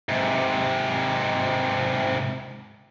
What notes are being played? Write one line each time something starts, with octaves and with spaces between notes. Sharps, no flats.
G#2 C3